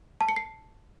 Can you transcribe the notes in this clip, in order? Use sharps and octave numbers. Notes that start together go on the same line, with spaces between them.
A5
C#7
C7